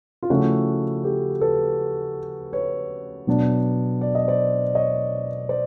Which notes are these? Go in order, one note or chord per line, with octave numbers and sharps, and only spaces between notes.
F4
C#3 F3 A3 C#4 E4 F#4
G4 A4
A4 B4
B4 C#5
B2 F#3 B3 D4
D5
D#5
C5 D5
C#5 D#5
C5 D5